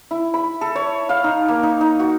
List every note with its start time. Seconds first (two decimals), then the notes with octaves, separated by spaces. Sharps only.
0.11 E4
0.34 B5
0.61 A4
0.75 C#5
1.09 F5
1.24 D#4
1.48 A#3
1.63 D#4
1.81 D#4
1.99 F#4